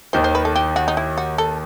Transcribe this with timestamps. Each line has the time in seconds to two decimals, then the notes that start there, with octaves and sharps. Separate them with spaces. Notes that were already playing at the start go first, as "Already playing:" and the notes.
0.13 D#2 D#3 C5
0.24 C5
0.35 B4
0.45 A4
0.56 G4
0.76 F#4
0.88 D#4
0.97 E4
1.18 F#4
1.38 A4